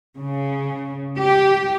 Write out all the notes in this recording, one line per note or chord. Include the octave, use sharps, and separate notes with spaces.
C#3
G4